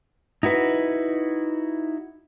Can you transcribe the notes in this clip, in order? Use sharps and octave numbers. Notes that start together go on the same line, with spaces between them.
D#4 E4 F#4 B4